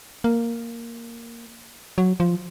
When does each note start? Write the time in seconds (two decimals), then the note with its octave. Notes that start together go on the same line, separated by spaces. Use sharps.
0.24 A#3
1.98 F#3
2.20 F3